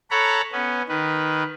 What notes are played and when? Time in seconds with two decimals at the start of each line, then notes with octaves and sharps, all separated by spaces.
0.11 A4 C#5 F#5 A#5 B5
0.52 B3 C#4
0.88 D#3 B4